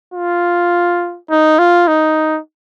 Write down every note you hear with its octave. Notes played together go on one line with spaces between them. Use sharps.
F4
D#4
F4
D#4